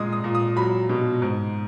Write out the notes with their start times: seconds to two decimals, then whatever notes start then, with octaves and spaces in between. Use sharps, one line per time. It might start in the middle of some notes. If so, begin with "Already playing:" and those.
Already playing: A#2 G#3 D#6
0.13 D#6
0.24 A#2
0.35 D#6
0.56 F#3 B5
0.89 B2
1.22 G#2